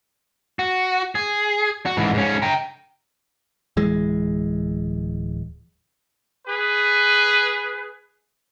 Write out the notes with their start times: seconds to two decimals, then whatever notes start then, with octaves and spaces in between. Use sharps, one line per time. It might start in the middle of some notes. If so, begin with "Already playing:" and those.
0.59 F#4
1.15 G#4
1.86 F#4
1.97 G#2 E3
2.14 G#2 C#4
2.42 G5 A#5
3.77 D1 E3 G#3
6.47 G#4 B4